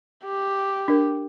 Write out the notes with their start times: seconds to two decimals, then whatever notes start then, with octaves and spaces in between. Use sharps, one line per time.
0.25 G4
0.88 D4 A#4